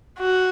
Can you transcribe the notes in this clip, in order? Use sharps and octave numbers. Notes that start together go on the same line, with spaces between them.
F#4